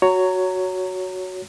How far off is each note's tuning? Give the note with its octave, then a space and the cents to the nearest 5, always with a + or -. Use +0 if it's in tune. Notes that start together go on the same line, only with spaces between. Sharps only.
F#4 +0 C#5 +10 A#5 -15